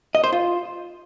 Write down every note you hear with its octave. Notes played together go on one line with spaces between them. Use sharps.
D#5
C5
F4